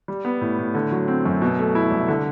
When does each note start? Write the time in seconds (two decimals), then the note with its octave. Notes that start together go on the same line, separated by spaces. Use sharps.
0.08 G3
0.25 B3
0.41 A2
0.59 A2
0.74 D3
0.92 F#3
1.08 C4
1.25 F#2
1.42 B2
1.59 A3
1.75 E4
1.91 C2
2.08 D3